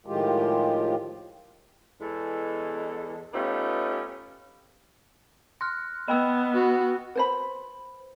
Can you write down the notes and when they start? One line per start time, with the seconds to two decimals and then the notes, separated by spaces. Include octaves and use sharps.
0.06 A2 D#3 F3 G#3 F4 G4
2.00 E2 G#3 A4
3.34 A3 B3 C#4 D#4 F4 G4
5.61 C6 F6 F#6 A#6
6.08 B3 D#5 G5 B5 E6
6.54 F#4
7.15 B4 C5 B5